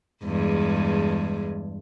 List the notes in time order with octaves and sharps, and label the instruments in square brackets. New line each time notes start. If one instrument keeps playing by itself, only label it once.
[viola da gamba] E2 G2 G#3